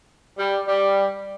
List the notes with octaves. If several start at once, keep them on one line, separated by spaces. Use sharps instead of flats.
G3
G3